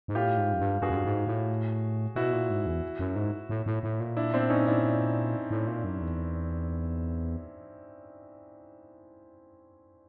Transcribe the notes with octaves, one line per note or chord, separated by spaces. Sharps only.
G#2
A2 F4 G4
G#2
F#2
G2
G2 F#4 G#4
F#2
G2
G#2
A2
B2 E4 F#4
A#2
G#2
E2
F#2
G#2
A2
A2
A2
A#2
D4 E4
C4 D4
C#4 D#4
D4 E4
A2
A#2
F#2
E2